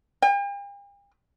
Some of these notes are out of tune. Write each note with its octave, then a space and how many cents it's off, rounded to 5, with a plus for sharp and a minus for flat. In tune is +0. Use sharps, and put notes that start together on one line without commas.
G5 +45